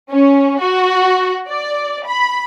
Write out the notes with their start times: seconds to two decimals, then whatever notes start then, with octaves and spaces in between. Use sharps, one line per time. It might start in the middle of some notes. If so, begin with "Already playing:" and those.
0.12 C#4
0.61 F#4
1.49 D5
2.08 B5